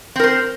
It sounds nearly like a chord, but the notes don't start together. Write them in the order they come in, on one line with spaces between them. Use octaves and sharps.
C4 A#4 C5